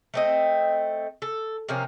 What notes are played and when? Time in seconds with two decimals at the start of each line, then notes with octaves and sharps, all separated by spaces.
0.14 A3 C4 D#5
1.22 A4
1.69 C3 F3 A#3 C#4